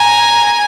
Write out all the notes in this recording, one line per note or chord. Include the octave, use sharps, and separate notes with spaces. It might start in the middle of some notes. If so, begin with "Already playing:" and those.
Already playing: G#5 A#5